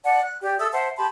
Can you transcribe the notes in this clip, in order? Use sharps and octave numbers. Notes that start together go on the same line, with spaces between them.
D5 F#5 A5
F#6
G4 D5 G5
A4 E5 D#6 E6
C5 E5 F#5 A5
G4 A5 B5 C6